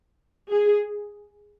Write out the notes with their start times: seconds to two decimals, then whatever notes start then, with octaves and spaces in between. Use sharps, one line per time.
0.50 G#4